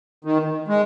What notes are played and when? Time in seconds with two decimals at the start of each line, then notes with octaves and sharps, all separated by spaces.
0.25 D#3
0.68 G#3